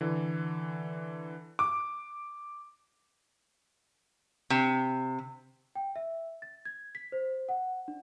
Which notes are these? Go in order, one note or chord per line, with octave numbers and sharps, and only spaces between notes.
D3 E3
D6
C3
G5
E5
A6
G#6
B6
C5
F#5
D4